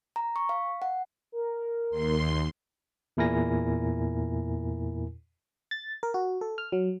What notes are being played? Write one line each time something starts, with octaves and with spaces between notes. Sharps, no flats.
A#5
C#6
F5
F#5
A#4
D#2 C6
E2 A#2 E4 A#4 G#5 A#6
A6
A#4
F#4
A4
F6
F#3